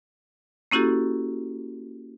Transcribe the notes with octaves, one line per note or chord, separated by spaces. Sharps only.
A#3 C#4 E4 F#4 G4 A4